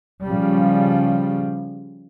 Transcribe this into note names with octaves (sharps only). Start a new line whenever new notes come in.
C#3 F3 G3